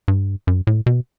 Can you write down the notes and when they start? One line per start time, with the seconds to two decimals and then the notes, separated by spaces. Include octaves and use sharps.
0.08 G2
0.47 F#2
0.67 A2
0.86 B2